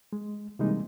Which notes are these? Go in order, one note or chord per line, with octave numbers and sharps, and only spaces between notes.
G#3
C3 E3 G3 G#3 A#3 D#4